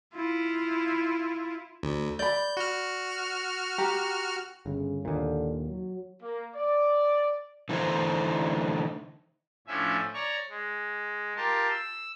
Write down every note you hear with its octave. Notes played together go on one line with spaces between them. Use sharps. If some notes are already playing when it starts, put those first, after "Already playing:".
E4 F4
D2
D5 B5 G6
F#4 F6
G4 A#5
G1 C#3
D#2 A#2 D3
F#3
A#3
D5
D3 E3 A3 D#4 C5
A2 F3 C#4 D4 E5 G#5
C#5 D5 A#5 C#6
G#3
F4 G4 A#4 A5 C6
E6